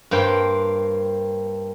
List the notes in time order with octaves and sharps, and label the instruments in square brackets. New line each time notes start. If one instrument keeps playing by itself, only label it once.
[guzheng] G2 A#3 C5 G5